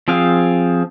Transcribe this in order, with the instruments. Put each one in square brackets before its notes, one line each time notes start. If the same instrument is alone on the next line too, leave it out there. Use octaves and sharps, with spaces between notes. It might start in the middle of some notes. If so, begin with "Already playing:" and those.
[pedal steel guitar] F3 C4 G#4 F5